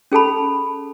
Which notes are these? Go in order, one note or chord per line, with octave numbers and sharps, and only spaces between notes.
C#4 G#4 A4 A5 B5